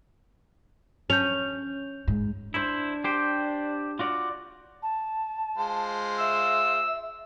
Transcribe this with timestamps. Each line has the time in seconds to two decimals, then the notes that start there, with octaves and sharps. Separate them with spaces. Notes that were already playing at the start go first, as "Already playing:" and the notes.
1.10 C#4 G6 F7
2.08 G#2
2.54 D4 E4 C5
3.04 G4 C5 G5
3.99 F4 F#4 D5
4.82 A5
5.58 G#3 F4 C5
6.20 E5 E6